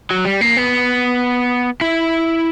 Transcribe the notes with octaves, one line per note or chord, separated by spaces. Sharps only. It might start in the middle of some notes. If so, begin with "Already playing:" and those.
F#3
G3
A#3
B3
E4